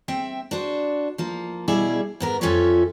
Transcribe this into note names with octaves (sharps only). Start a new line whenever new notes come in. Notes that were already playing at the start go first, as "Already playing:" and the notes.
C4 E5 G5
D4 F#4 C5
F3 A#3
B2 G3 E4 G#4
G#2 B3 A#4
F2 C#4 F4 A4 C#5 E5